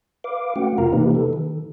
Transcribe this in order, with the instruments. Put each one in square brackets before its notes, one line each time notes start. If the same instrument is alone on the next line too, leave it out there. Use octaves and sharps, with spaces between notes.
[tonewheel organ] B4 F5 D6
A3 C#4 F#4 F#5 G5
F2 C3 F4 A#4 F5 A#5
C3 E3 A#3 D#4 G4 B4
A4
D#3